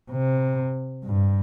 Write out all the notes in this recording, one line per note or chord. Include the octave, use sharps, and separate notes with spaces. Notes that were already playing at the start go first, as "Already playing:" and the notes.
C3
G2